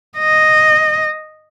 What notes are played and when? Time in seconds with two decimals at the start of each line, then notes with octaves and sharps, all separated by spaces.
0.18 D#5